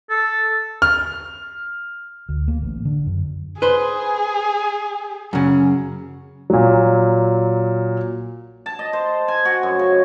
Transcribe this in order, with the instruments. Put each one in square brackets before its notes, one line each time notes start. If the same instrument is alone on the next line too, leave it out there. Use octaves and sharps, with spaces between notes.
[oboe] A4
[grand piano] F6
[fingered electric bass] D2
A#3
A1
D3
F#2
[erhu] G#4 [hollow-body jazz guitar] B4 C5
[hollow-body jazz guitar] F#2 C#3
[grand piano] A#2 F#3
[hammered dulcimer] A5
D#5
C5
G#5
F#4
F#2
C#3